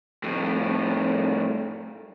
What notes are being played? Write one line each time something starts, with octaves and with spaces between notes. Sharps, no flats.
F2 A2